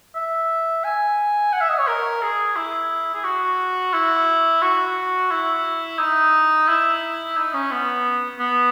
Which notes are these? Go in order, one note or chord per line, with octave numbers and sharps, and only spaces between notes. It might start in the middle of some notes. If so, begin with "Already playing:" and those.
E5
G#5
F#5
E5
D#5
C#5
A#4
G#4
E4
G#4
F#4
E4
F#4
E4
D#4
E4
D#4
C#4
B3
B3